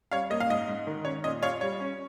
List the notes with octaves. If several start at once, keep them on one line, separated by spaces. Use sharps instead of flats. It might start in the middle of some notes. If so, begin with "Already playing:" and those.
G3 C#5 F5
A#3 D#5
F5
G#2 D#5
G#2
D#3
C#4 C#5
A#2 D#5
F4 C#5 F5
G3 C#5
C#4